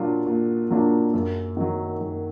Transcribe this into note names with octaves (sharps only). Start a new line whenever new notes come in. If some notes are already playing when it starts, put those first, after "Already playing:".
Already playing: A#2 F#3 A#3 D4 F4
A#2
F#3 A#3 D4 F4
F#2
D#3 F#3
F#2